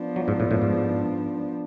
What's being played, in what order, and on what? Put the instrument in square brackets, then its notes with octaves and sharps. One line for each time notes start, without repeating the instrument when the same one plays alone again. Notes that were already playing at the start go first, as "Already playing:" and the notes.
Already playing: [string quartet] F3 B3 D4
[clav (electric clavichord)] F#3
G#2
A2
A2
G#2